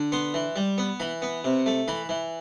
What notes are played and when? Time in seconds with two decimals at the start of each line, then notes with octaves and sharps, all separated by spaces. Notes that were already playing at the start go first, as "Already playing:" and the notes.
Already playing: D3
0.12 B3 C6
0.34 E3
0.56 G3
0.78 B3
1.00 E3 B5
1.22 B3
1.44 C3
1.66 A3
1.88 E3 B5
2.09 E3